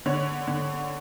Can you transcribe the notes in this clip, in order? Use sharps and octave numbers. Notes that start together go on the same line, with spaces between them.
D3 C#5
D3